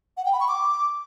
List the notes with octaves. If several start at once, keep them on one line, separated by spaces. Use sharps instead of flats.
F#5
G5
B5
C#6
D6